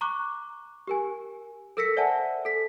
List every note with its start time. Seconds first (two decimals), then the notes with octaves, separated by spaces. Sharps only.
0.01 A#5 C#6 D6 F#6
0.87 G4 A#4 G#5
1.77 A4 A#4 E6 A#6 B6 C#7
1.96 C5 D5 E5 F#5 G#5 A5
2.45 A4 B6